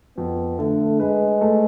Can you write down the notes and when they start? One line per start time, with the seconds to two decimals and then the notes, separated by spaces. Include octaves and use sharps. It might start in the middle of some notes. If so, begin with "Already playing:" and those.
0.17 F2 B3
0.59 D3 A3
1.00 G#3 B4
1.41 A3